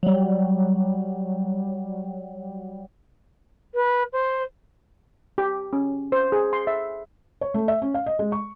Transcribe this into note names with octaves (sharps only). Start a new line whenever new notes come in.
F#3 G3
B4
C5
G4
C#4
C5
G#4
C6
E5
C#5
A3
E5
C#4
F5
D#5
G#3
C#6